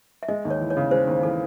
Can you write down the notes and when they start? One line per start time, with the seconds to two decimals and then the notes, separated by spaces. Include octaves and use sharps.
0.23 E5
0.28 G#3 D#5
0.45 D#2
0.51 C#5
0.61 E3
0.70 C#5
0.77 C#3
0.91 G#3 C5
1.07 D#2
1.23 E3 A4